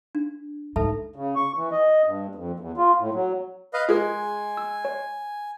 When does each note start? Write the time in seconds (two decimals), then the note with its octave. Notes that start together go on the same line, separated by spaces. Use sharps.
0.15 D4
0.76 G#2 A4 E5 A5
1.16 C#3
1.36 C#6
1.57 E3
1.72 D#5
2.05 G2
2.35 F2
2.60 E2
2.77 F4
2.99 A2
3.14 F#3
3.74 B4 D#5 F5
3.89 G#3 F4 G#4 A#4 G#5
4.57 E6
4.85 C#5